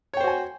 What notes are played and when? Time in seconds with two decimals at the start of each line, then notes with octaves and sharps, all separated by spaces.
0.14 C#5
0.17 G5
0.21 C5
0.24 F#4
0.28 G#5